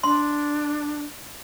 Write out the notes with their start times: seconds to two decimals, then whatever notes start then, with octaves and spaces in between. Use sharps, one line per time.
0.03 D4 C6